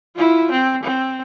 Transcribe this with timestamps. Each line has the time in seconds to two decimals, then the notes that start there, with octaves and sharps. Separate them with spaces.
0.16 E4 F4
0.51 C4
0.83 C4